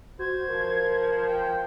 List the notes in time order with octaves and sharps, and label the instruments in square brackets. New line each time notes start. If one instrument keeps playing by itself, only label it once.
[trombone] F#4 [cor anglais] C5 [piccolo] G#6
[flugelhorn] F3 [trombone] A#4
[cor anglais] G5